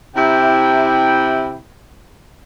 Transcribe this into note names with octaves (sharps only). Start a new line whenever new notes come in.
C3 E4 G5